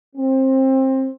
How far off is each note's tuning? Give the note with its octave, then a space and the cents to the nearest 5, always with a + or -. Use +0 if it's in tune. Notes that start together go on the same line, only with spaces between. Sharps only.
C4 +20